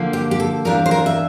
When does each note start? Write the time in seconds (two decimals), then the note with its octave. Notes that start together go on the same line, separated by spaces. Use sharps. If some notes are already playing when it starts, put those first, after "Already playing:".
Already playing: D3 F3 A#3
0.13 G4
0.31 G4
0.40 A4
0.65 E2 E3 G3 D4 F4 A#4
0.86 C5
0.91 A#4
1.06 E5